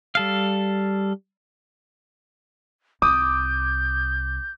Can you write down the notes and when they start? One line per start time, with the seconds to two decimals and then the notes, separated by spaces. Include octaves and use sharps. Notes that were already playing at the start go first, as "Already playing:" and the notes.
0.15 G3 A4 F5
3.02 C2 D6 D#6 G6